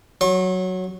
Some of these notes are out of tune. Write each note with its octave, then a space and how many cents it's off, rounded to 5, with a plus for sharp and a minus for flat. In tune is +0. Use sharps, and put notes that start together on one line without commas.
F#3 +0 C#6 -40